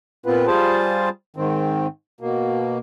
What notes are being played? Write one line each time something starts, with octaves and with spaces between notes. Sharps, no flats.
A#2 B3 C4 F4 B4
G3 F4 G#4 C5 A5
G#2 D#3 C4
B2 A#3